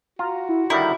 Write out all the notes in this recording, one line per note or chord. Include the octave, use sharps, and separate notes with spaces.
F4 F#4 A#5
E4
D3 D#3 G3 E4 A#5